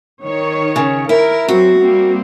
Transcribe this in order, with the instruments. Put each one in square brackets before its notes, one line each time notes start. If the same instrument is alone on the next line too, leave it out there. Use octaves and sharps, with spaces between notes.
[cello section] D#3 C#5
[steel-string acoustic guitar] C#3
[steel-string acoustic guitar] E4 [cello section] A#4
[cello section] F#3 C4 [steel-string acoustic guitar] F#4
[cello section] G3 A#3 C4